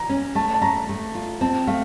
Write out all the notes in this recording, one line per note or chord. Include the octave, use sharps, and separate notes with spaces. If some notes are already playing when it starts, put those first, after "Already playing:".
Already playing: A#5
C#4
A3 A5
A5
A3 A#5
A3
F4
C4 A5
A3 F5